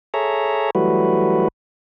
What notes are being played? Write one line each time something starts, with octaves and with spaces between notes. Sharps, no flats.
G#4 A4 C#5 E5 A#5
E3 F#3 G3 A3 F#4 B4